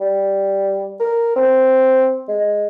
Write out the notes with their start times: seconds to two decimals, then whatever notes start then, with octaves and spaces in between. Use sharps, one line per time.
0.01 G3
1.00 A#4
1.36 C4
2.28 G#3